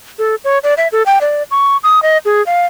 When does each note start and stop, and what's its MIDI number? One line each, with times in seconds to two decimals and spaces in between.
0.19 0.35 69
0.44 0.59 73
0.63 0.74 74
0.77 0.88 76
0.92 1.03 69
1.06 1.19 79
1.21 1.43 74
1.51 1.77 85
1.84 2.02 87
2.02 2.18 75
2.25 2.44 68
2.46 2.66 77